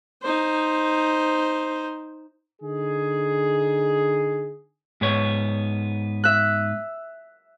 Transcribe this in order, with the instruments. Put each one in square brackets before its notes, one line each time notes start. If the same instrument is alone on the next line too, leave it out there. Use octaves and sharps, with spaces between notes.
[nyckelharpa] D#4 C5
[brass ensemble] D3 D#4 G#4
[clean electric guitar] G#2 B3 C#5
[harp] E5 F#6